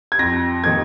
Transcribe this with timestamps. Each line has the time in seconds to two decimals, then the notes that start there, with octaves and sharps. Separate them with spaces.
0.12 G#6
0.19 F2 A#6
0.64 D#3 A#3 G#6